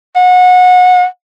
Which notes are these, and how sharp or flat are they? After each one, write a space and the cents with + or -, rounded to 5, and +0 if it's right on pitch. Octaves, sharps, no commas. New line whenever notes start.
F#5 -25